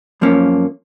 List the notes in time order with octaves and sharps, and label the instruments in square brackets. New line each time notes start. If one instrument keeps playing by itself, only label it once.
[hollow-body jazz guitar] F#2 F3 A#3 C#4